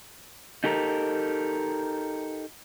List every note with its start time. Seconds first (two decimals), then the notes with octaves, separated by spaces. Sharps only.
0.64 D#4 G4 A4 A#4